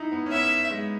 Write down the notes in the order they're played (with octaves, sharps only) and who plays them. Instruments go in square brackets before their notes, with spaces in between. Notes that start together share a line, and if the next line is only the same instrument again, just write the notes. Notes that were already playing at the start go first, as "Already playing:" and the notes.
Already playing: [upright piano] D#4 E4
B3
C#4
[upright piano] B3 [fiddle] E5
[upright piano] G#3